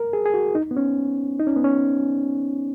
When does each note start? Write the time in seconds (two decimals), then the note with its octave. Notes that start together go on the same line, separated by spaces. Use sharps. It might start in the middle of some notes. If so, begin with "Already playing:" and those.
Already playing: A#4
0.13 G#4
0.26 G#4
0.34 F#4
0.55 D#4
0.71 B3
0.77 C#4
1.40 D#4
1.47 C#4
1.56 B3
1.64 C#4